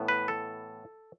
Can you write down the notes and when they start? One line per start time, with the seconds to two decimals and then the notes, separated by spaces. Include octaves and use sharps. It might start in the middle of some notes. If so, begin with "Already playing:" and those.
Already playing: A2 E3 B3
0.08 B4
0.28 A4